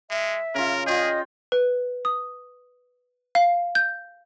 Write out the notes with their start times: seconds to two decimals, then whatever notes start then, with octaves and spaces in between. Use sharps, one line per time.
0.11 G#3 E5
0.55 C#3 F4 A#4
0.86 F4 G#4 D5 D#5 G5
1.52 B4
2.05 D#6
3.35 F5
3.75 G6